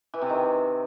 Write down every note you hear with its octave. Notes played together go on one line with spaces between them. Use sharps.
E3
C3
D#3